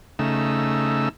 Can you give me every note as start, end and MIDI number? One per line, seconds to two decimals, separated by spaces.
0.19 1.09 49
0.19 1.09 57
0.19 1.09 63
0.19 1.09 88